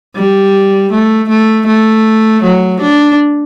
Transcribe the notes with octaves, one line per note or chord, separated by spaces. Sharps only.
G3
A3
A3
A3
F#3
D4